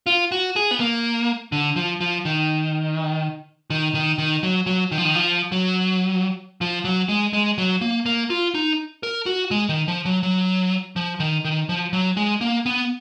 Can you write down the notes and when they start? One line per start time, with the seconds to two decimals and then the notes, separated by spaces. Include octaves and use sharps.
0.06 F4
0.32 F#4
0.56 G#4
0.71 B3
0.80 A#3
1.52 D3
1.76 F3
2.01 F3
2.25 D#3
3.70 D#3
3.94 D#3
4.18 D#3
4.43 F#3
4.66 F#3
4.92 D#3
4.98 F3
5.05 D#3
5.15 F3
5.52 F#3
6.61 F3
6.85 F#3
7.09 G#3
7.33 G#3
7.58 F#3
7.81 A#3
8.06 A#3
8.30 F4
8.55 D#4
9.03 A#4
9.26 F#4
9.51 G#3
9.69 D#3
9.88 F3
10.05 F#3
10.23 F#3
10.96 F3
11.20 D#3
11.45 D#3
11.69 F3
11.93 F#3
12.17 G#3
12.41 A#3
12.66 B3